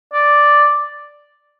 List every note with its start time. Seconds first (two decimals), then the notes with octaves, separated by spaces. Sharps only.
0.14 D5